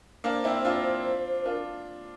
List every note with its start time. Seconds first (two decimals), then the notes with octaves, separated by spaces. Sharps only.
0.24 A#3 D4 C5
0.44 C4 E4
0.65 D4 F4
1.45 D4 F4 A#4